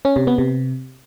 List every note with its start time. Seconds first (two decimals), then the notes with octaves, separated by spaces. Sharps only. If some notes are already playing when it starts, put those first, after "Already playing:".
0.05 C#4
0.16 C3
0.27 B3
0.38 C3